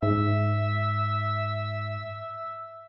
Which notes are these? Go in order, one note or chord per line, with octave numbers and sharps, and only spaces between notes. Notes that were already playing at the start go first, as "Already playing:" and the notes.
G#2 E5